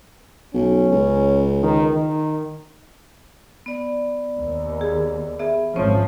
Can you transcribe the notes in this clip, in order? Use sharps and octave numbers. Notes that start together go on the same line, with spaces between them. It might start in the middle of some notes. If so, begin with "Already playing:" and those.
B1 C#4
C#2
D#3
D#3
B3 D5
D#2
G#4
B3 G#4 E5
G#1 F3 C4 C#4 C5 C#5